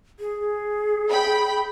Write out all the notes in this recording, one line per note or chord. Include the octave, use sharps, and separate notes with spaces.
G#4
G5 B5